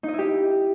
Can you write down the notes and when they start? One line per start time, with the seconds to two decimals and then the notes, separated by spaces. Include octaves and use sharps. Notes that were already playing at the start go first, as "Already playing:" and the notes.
0.03 D#4
0.08 D#5
0.13 E4
0.19 G4